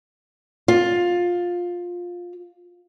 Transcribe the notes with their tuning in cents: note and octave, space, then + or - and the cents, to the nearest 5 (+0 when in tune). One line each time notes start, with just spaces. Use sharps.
F4 +15